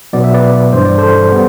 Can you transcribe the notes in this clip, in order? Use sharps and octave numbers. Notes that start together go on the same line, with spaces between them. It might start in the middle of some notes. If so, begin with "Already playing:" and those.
B2 F#3 B3 D5
E5
B4 D5
G2 E3 G3 C5
D5
A4 C5
G3 B3